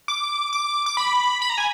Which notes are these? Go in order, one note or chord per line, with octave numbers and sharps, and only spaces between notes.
D6
D6
D6
B5
B5
A#5
G#5